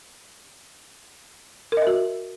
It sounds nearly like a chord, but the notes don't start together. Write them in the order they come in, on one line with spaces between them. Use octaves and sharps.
A#4 D#5 E5 F#4